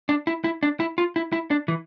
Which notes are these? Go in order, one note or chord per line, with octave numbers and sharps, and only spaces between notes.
D4
E4
E4
D4
E4
F4
E4
E4
D4
E3